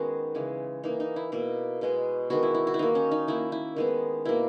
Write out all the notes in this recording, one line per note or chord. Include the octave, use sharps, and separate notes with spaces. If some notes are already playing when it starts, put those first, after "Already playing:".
Already playing: D#3 G#3 B3 C#4 F#4
C#3 E3 G#3
E3 A#3 D#4
D#4
E4
B2 A#3 E4
B2 G#3 B3
D#3 G#3 B3 F#4
E4
E4
F#4
E4
D#3 A#3 D#4
C#4
D#4
D#3 A#3 E4
E4
D#3 G#3 B3
B2 A#3 E4